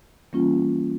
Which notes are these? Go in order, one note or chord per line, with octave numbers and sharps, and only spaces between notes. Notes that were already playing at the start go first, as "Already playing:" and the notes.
E3 G3 A#3 C#4 F4